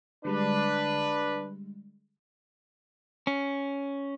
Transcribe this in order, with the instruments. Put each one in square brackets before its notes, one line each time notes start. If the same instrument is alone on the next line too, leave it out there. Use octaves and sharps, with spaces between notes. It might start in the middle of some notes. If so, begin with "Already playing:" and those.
[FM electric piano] D3 G3 G#3 [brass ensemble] D4 B4
[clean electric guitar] C#4